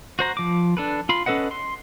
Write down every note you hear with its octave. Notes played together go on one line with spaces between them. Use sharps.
F#4 C5 A#5
F3 D6
D4 A4 B4
F4 B5 C6
C#4 A4 B4 D#5 F#5
C6